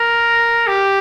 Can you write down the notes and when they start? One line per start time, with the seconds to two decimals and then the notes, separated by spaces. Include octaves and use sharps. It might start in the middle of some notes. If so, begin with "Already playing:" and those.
Already playing: A#4
0.67 G4